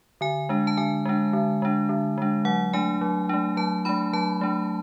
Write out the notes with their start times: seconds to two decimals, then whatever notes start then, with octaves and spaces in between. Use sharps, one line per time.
0.21 D3 G#5
0.49 G#3 D4
0.67 A5
0.77 D3 G#5
1.06 G#3 D4
1.33 D3
1.62 G#3 D4
1.89 D3
2.18 G#3 D4
2.45 F#3 F#5
2.73 A3 D4 G#5
3.01 F#3
3.29 A3 D4
3.57 F#3 A5
3.85 A3 D4 B5
4.13 F#3 A5
4.41 A3 D4